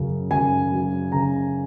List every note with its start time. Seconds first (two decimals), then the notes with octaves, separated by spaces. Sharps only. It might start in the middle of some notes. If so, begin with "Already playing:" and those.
Already playing: F#2 C#3
0.31 F#2 G#5
0.72 F#3
1.12 C#3 A#5